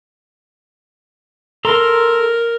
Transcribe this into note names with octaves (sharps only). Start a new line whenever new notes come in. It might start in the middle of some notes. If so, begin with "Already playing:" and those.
A4 A#4 A#5 C6